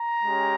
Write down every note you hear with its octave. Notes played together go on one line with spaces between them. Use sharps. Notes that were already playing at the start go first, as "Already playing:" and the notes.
Already playing: A#5
G#3 C#4 G4